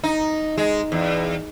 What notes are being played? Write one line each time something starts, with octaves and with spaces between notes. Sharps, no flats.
D#4
G#3
E2